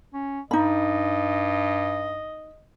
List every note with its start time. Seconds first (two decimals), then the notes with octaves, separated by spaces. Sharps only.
0.14 C#4
0.51 G2 D#4 D#5 B5